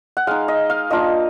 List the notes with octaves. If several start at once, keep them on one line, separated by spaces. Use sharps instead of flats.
F#5
G#3 D#4 F5
D#5
F5
A#3 D4 F4 D#5